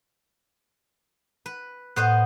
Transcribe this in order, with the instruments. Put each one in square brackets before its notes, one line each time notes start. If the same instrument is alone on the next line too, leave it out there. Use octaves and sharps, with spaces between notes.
[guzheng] B4
[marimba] A2 F#6 [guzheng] B3 C5 D#5